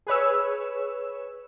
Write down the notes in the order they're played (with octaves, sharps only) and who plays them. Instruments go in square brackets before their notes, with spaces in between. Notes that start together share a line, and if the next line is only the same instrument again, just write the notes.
[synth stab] G#4 B4 C#5 E6